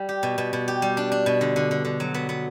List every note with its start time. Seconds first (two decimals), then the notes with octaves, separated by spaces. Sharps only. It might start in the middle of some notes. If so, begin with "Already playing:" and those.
Already playing: G3
0.09 G4
0.23 B2
0.38 B2
0.53 B2
0.68 G4
0.82 G3
0.97 D4
1.12 D4
1.26 B2
1.41 D3
1.56 D3
1.71 D3
1.85 D3
2.00 F#3
2.14 B3
2.29 B3